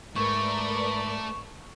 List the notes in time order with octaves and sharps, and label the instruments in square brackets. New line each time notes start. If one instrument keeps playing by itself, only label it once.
[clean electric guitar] G#2 [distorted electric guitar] A3 [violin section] A#4 B4 D5 [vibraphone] C#6